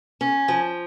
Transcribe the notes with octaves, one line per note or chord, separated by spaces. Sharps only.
C#4
F3